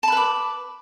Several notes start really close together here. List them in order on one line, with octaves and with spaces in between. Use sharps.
A5 B5 B4 D6